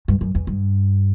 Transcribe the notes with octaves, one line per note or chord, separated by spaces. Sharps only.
G2
F#2
E2
G2